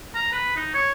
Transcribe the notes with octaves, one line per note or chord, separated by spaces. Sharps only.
A#5
B4
D#4
C#5